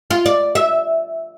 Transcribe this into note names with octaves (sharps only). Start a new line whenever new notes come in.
F4
D5
E5